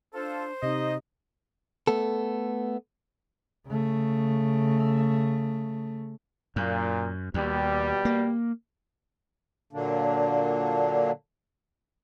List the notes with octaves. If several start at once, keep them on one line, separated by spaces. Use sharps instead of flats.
D4 F4 A4 C5
C3 D#4 D#5
A3 B3 A4
C#3 A3
F#2 A#2
D#2 B2 G3
A#3
A#2 D3 F#3 A#3 D4